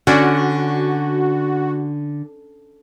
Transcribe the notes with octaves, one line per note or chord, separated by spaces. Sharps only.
D3 C#4 D4 F#4